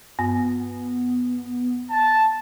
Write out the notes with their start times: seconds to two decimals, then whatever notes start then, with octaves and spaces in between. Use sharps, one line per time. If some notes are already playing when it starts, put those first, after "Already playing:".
0.19 G2 B3
1.90 A5